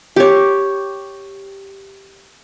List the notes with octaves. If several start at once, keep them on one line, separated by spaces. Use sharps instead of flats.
G4 C#5